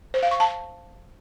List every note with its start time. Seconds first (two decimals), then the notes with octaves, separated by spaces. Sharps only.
0.14 C5
0.23 F5
0.31 C#6
0.40 A5